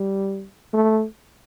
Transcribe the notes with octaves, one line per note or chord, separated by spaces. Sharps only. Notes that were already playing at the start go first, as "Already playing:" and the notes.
Already playing: G3
A3